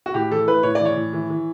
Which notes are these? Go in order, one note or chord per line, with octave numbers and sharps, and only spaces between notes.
F#4
A2 G4
E3 A4
A2 B4
A2 C#5
E3 D5
C#5
A2
E3
E3